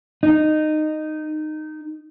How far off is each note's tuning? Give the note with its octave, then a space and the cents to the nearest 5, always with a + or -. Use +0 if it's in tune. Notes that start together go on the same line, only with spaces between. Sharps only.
D#4 -15